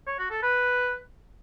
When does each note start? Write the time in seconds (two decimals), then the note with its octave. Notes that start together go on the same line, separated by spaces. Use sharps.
0.07 C#5
0.19 F#4
0.30 A4
0.42 B4